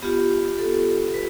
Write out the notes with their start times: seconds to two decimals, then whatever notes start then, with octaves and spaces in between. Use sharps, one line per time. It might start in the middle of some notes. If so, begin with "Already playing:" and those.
0.02 B3 F4 G4
0.59 A4
1.14 B4